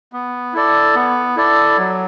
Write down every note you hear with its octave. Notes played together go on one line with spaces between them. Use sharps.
B3
E4 A4 D5
B3
E4 A4 D5
F#3